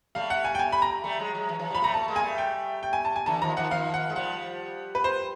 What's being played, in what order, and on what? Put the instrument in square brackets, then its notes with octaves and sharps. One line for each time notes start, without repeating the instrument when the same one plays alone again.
[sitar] G3 A3 [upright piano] F5
[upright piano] F#5
G#5
G5
G#5
B5
A#5
[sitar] G3 A3
F#3 G#3
F#3 G#3
E3 F#3
E3 F#3
[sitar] F3 G3 [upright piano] B5
[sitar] G3 A3 [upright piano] A#5
[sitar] A3 [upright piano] A5
[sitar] G#3 A#3
[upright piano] G#5
[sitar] G3 A3
[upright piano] G5
G5
G#5
A5
G#5
[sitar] D3 E3 [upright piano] A5
[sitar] D#3 F3 [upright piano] A#5
[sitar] D#3 F3 [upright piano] F#5
[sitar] D#3 F3 [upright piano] F5
[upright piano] F#5
[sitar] G#3
[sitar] F3 G3 [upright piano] F#5
[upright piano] B4
C5